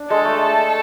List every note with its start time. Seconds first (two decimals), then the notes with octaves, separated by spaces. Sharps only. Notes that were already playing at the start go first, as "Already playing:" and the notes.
Already playing: D4
0.10 G#3 A4
0.25 A3
0.42 A4